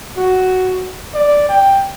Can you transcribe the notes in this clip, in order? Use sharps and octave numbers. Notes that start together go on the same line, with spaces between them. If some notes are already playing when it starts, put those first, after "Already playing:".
F#4
D5
G5